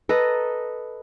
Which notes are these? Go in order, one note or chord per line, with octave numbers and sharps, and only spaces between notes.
A4 B4 D#5 A#5